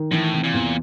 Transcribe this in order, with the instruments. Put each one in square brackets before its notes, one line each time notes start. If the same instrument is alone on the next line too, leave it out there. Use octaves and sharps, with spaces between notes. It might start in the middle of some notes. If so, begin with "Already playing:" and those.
Already playing: [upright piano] D#3
[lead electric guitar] A2 [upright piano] E3
[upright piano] C3
[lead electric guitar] A#2
[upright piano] E2